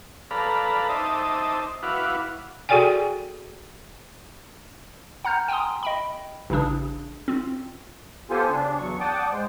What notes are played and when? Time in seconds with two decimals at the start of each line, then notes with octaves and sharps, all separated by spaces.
0.31 A4 B4 D5 F5 A#5 B5
0.89 D#4 C5 E5 A5 D6 D#6
1.83 E4 F#4 B4 F5 D6
2.69 F#4 G#4 A4 D5 G5 G#5
5.25 F#5 A#5 F6 G6
5.48 G5 G#5 A#5 C6 D#6
5.83 D#5 G5 B5
6.50 A1 C#3 D4 D#6
7.28 C4 F4
8.30 B3 F4 G4 A4 C5 G#5
8.50 C#3 D4
8.78 E2 F#3 C#6
9.00 D5 F#5 G5 A5 D6 D#6
9.32 G#2 G#3 C5